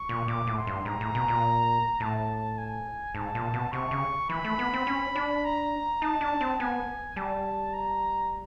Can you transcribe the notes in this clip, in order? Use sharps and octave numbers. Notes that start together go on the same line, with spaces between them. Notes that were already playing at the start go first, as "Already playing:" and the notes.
Already playing: C#6
A#2
A#2 D6
A2
C6
G2
G#2 A#5
A2
B2
A#2
A2 A5
G#5
G#2 A5
A#2
B2
C3 C#6
C#3
E3 B5
A3
B3
C4
C#4
D4
A#5
D#4 A5
D4
C4
B3 G#5
G3 A5
A#5